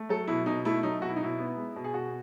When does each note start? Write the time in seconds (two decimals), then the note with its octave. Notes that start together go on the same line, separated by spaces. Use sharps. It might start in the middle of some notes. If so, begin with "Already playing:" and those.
Already playing: A3
0.09 F#3 A4
0.27 B2 E4
0.46 B2 D#4
0.65 A3 E4
0.83 F#3 D#4
1.01 B2 F#4
1.09 E4
1.16 D#4
1.21 B2 E4
1.39 B3
1.57 G#3
1.76 B2
1.84 G#4
1.94 B2 F#4